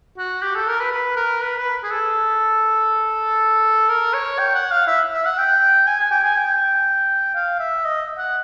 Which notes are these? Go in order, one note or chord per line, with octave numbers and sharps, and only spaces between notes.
F#4
G4
A4
A#4
B4
B4
A#4
B4
B4
G#4
A4
A#4
C#5
G5
F#5
F5
E5
E5
F#5
G5
G#5
G#5
G5
G#5
G5
F5
E5
D#5
F#5